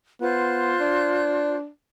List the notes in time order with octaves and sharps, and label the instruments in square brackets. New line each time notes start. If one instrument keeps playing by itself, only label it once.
[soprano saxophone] B3 [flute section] F4 C5 F#6
[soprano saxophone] D4